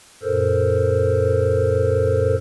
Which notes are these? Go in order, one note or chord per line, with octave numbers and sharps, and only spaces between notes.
F#2 A#2 A4 A#4 C5